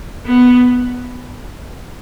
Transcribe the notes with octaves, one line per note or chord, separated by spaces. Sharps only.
B3